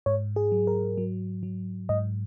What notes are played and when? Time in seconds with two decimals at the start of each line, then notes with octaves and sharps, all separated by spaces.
0.06 G#2 C#5
0.36 G#4
0.52 F#3
0.67 A#4
0.98 F#3
1.43 F#3
1.89 G#2 D#5